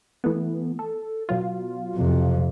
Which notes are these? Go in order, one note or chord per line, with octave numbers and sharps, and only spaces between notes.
E3 A3 B3
A4
B2 F#3 F4
F2 C3